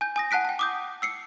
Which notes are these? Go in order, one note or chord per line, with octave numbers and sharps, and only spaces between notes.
G#5 G6
G#5 D#6 A#6
F#5 A5 F#6 B6 D7
G5 A5
D6 D#6 G6
E6 C7 C#7